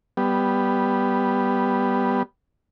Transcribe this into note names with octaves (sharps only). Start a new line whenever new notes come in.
G3 B3